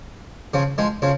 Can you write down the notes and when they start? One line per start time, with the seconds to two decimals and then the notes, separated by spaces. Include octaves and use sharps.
0.54 C#3 F3
0.78 F3 G#3
1.02 C#3 F3